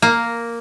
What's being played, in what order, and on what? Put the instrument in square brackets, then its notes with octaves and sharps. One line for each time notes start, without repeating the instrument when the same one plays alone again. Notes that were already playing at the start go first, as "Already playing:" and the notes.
[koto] A#3